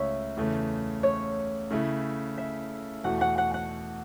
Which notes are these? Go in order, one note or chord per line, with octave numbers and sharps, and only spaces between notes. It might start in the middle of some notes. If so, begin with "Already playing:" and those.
Already playing: C#2 C#3 A3 C#5 E5
E2 C#3 A3
C#5
C#3 A3 E4 A4
E5
E2 B2 A3 F#4 F#5
F#5
F#5
F#5